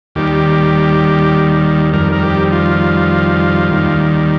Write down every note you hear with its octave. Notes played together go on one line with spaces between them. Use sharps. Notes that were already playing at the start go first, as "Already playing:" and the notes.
D#2 D#3 G3 G4
F2 D#3 G3 A#4
A#4
G4
F4
D#2 D#3 G3